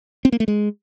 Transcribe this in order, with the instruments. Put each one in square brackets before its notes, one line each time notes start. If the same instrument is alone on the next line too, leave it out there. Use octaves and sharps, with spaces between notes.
[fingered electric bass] C4
A#3
A3
G#3